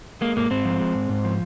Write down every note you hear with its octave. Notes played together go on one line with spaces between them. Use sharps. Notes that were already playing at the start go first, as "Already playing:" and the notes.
G#3 A#3
G#2 A#3
G#2 C4
F3
G#3
G#2
G#2
F3